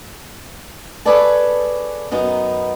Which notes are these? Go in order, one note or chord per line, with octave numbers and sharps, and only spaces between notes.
G#4 A4 B4 C#5 D5 A5
F#2 B3 D#4